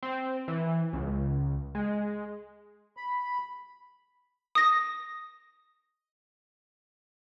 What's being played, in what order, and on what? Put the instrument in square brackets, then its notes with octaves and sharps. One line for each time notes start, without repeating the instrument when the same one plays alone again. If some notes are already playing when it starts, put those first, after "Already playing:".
[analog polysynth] C4
E3
C#2
G#3
[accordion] B5
[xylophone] D#6 A#6